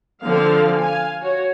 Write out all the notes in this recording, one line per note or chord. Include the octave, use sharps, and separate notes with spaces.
D3 F3 C4 F5
F5 G#5
F#4 C#5